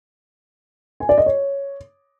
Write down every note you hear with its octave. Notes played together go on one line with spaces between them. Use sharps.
G#5
D5
D#5
C#5